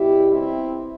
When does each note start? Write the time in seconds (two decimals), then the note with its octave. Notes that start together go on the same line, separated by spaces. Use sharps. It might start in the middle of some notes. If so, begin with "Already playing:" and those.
Already playing: B2 G3 E4 G4
0.31 C4 E4